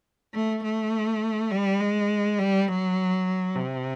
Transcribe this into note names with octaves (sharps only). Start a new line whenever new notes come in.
A3
A3
G3
G#3
G3
F#3
C3